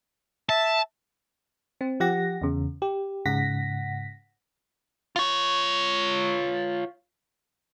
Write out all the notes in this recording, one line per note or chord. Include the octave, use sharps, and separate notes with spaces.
E5 A5
C4
F3 G4 F#5 A#6
E2 C#3
G4
G#2 C#3 F#5 A#6 B6
F4 C#5